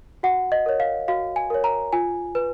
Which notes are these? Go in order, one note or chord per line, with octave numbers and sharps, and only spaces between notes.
F#4 F#5
D#5
A#4 C#5
F5
F#4 F5
G#5
A#4 C#5
A#5
F4 G#5
B4